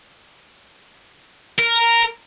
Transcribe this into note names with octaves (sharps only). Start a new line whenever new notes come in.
A#4